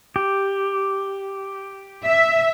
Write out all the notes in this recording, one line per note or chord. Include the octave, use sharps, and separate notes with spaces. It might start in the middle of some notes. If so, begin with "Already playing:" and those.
G4
E5